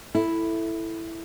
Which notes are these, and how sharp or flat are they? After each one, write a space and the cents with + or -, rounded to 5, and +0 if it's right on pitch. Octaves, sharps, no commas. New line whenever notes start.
E4 +0 A4 +0